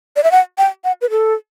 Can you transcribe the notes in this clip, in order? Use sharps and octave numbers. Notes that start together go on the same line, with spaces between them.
D5
E5
F#5
G5
F#5
B4
A4